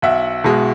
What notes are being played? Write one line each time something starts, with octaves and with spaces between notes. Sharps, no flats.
B1 E5 F#5
B2 G#3